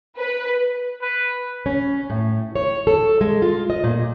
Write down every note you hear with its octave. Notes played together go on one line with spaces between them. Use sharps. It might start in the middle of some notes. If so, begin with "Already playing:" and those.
B4
B4
C#4
A2
C#5
A4
G#3
F4
D#5
A#2